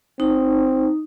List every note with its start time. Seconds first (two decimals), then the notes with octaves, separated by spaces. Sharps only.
0.20 C4 D#4